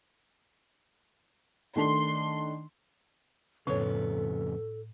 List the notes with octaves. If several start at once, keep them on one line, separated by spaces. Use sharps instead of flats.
D#3 A3 D4 C6
F2 A2 C#3 B3 A4 C#5